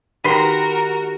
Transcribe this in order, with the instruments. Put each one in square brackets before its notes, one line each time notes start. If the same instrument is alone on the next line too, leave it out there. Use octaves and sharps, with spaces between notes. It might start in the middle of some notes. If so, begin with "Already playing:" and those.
[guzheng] D#3 G#3 [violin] F#4 A#4 [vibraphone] G4 [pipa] B4 B5 C6